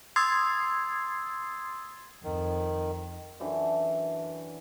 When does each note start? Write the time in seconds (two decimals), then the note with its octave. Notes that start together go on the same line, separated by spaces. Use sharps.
0.16 C6 D#6 E6 G#6 A6 C7
2.24 F2 D#3
3.40 F#2 D3 E3 D6